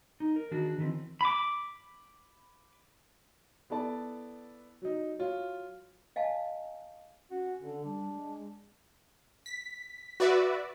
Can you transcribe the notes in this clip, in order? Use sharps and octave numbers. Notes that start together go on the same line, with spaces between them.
D#4
A#4
D#3 D4 F#4 G#4
D#3 E3 C4
B5 D6
B3 E4 A4 D5 A5
F#3 D#4
F#3 F4 C#5
D#5 F5 G#5 A5
C#4 F#4
D3
G3 D4
G#3
B6
F#4 B4 D5 E5